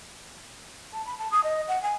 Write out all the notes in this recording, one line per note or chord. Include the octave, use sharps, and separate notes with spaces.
A5
B5
A5
D#6
D#5
F#5
G#5